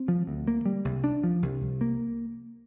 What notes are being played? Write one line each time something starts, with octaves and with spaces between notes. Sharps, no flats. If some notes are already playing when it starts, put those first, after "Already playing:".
Already playing: C4
F3
D2
A#3
G3
C2
D4
F3
C2
C2
A#3